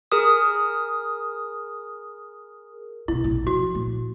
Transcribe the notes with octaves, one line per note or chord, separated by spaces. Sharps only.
G#4 A#4 D#6
B2 D3 E4
A#1 E2
F3 F#4
A#2